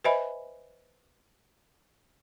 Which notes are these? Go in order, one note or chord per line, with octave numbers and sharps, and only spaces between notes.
B4 C5 D#5 E5 G#5 B5